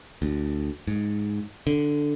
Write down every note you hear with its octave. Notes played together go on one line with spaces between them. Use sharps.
D2
G#2
D3